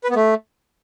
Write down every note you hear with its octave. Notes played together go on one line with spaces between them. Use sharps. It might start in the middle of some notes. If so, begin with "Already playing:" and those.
B4
B3
A3